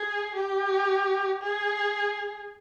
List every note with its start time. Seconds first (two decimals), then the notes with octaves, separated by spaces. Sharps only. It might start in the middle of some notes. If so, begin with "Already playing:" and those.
Already playing: G#4
0.35 G4
1.42 G#4